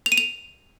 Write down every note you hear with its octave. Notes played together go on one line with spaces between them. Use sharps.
F7
D#7
F7